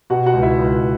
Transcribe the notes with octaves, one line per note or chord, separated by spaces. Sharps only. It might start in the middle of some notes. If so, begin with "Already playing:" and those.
B2 F#4 F#5
F#4 F#5
C#2
E4 E5
C#2